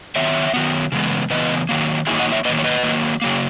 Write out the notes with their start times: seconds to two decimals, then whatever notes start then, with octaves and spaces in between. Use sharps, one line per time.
0.16 D#3 F#3 B3 C#5 E5
0.54 D#3 F#3 B3
0.92 C#3 E3 G#3 B3
1.30 C#3 E3 B3 B4 D#5
1.69 D#3 F#3 A#3
2.07 D#3 F#3 A#3 E4 G#4
2.19 D#5 F#5
2.32 C#5 E5
2.45 D#3 F#3 A#3 B4 D#5
2.59 C#5
2.64 B4 D#5
2.83 D#3 F#3 A#3
3.22 C#3 F#3 A#3